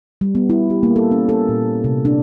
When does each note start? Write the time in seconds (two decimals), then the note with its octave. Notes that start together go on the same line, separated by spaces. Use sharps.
0.21 G3
0.35 B3
0.50 E4
0.70 G4
0.83 A#3
0.96 A4
1.11 C#4
1.29 A4
1.49 A#2
1.84 C3
2.05 D4